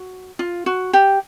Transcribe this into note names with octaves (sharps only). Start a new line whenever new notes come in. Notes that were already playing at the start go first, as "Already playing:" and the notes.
Already playing: F#4
F4
F#4
G4